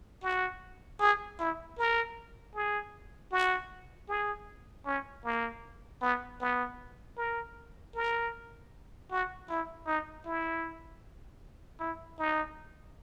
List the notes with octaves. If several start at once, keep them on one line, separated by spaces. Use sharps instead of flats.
F#4
G#4
E4
A#4
G#4
F#4
G#4
C#4
A#3
B3
B3
A#4
A#4
F#4
E4
D#4
E4
E4
D#4